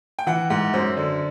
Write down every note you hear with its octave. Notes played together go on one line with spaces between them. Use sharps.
G5
E3 F#5
G#2 F#5
F#2 C5
D3